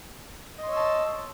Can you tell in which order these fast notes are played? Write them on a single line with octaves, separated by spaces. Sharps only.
D#5 C6 C#5 E6 A5